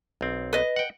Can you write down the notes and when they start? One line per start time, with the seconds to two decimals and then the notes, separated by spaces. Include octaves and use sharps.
0.21 B1 C4
0.53 B4 D#5
0.76 F#5 G5